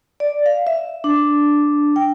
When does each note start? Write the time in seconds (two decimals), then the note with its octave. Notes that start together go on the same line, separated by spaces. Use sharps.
0.20 D5
0.46 F5
0.67 E5
1.04 D4
1.96 G5